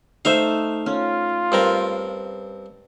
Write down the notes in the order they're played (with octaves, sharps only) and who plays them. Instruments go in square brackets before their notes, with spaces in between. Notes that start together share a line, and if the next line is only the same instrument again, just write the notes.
[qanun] A3 D#4 [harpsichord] C5 E5 F5
[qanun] C#4 [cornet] F4
[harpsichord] G2 C4 A#4